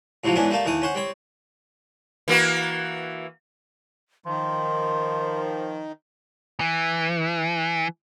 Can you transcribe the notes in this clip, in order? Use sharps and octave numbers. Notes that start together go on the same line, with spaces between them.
A2 C3 F3 F#3
G#2 E3 B3 C#4 D4 E4
G3 A3 A#3 A4
D#2 E3 A3 D#6
C#4 C5 F#5
G3 C4 C#5
E3 A#3 F#4
D#3 F3 C6
E3